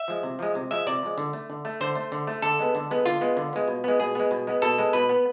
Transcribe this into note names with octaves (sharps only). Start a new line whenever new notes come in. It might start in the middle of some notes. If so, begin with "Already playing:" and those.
Already playing: E5
F3 G#3
C3
F3 G#3
C3
F3 G#3 E5
C3 D5
F3 G#3
D3
A3
D3
A3
D3 C5
A3
D3
A3
D3 A4
G#3 B3
D3
G#3 B3
D3 F4
G#3 B3
D3
G#3 B3
B2
G#3 B3
B2 G#4
G#3 B3
B2
G#3 B3
B2 A4
G#3 B3
B2 B4
B3